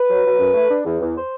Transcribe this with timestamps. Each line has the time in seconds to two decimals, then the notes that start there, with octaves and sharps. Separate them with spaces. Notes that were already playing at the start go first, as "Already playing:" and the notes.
Already playing: B4
0.08 F#3
0.24 F#3
0.38 F#2
0.54 A3
0.69 D4
0.85 E2
1.00 E2
1.16 C5